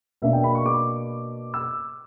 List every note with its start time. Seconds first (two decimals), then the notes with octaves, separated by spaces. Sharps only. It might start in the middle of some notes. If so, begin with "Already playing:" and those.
0.22 B2 A#3 D4 E5
0.33 G5
0.44 B5
0.55 C#6
0.66 D6
1.54 E6